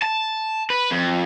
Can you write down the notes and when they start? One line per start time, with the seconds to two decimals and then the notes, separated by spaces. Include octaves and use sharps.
0.02 A5
0.70 B4
0.91 F2